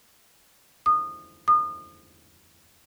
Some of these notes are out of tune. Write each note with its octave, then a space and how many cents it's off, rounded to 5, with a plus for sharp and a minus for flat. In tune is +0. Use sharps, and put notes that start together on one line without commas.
D#6 -25
D#6 -35